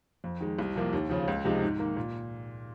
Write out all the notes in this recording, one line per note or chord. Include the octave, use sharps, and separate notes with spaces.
F2
D#3 G#3
C2
C3 F3 A#3
D#2
C#3 F3
C#2
C3 F3 G#3 D#4
G#2
D#3 A#3
A#2